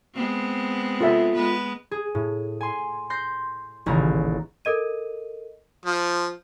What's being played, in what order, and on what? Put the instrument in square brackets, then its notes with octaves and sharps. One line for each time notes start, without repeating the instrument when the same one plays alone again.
[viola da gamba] G#3 B3 C4
[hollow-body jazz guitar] F4 A4 E5
[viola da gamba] G#3 B3 B4
[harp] G#4
A2
G#5 C6
C6 G6 A#6
D#1 A1 C#3 A#5
[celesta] A4 A#4 D#5 D#7
[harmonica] F3